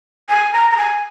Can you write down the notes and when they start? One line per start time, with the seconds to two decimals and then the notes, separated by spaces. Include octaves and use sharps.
0.29 G#5
0.53 A#5
0.71 A#5
0.78 G#5